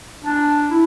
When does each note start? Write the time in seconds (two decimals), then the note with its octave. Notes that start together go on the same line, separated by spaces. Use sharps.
0.25 D4
0.71 E4